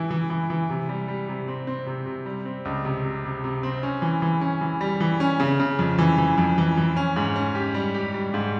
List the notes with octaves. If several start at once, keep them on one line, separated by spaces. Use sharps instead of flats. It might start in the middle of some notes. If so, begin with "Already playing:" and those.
Already playing: E3 E4
E3
E3
E3
C3
G3
G3
C3
C4
C4
C3
C3
G3
C4
C#2
C3
C3
C3
C3
C4
C#4
E3
E3
C#4
E3
G3
E3
C#4
C#3
C#3
F2
E3
E3
F2
E3
E3
C#4
G#2
C#4
G4
G3
G4
G3
G#2